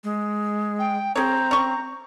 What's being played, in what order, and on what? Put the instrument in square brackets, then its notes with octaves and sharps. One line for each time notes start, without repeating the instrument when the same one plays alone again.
[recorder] G#3
[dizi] G5
[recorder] C4 [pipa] G#4 C#5 [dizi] A#5
[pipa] C#4 C#6